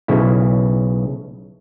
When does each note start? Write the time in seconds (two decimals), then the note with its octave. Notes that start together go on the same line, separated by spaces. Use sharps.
0.08 B1 C#3 E4